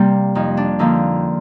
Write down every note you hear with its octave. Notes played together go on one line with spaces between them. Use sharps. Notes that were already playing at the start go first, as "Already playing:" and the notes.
Already playing: C3 G3 A#3
F2 D#4
D4
D3 F3 A#3 D#4